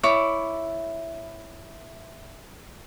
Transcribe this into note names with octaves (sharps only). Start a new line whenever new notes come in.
E4 C#5 D6